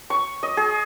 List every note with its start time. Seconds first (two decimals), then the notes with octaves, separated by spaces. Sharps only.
0.10 C#6
0.43 D#5
0.57 G#4